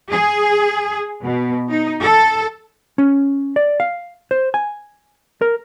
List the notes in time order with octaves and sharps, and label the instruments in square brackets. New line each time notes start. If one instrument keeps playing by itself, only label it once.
[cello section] G#4
B2
D#4
A4
[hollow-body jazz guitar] C#4
D5
F5
C5
G#5
A#4